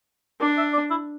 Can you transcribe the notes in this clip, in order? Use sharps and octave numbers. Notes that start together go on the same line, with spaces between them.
D4 D5
E5
D5
E4